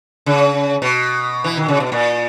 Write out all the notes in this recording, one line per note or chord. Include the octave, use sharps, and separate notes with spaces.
C#3
B2
E3
D#3
C#3
B2
A#2